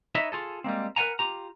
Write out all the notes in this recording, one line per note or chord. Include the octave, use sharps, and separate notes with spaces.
D#4 B4 C#5 D#5 E5
F4 G#4 A4
G3 G#3 A#3 C4
A#4 B4 D5 F#5 G#5 A#5
F4 G4 A#5